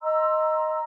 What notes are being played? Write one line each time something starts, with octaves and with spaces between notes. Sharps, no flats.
D#5 A#5 C6 E6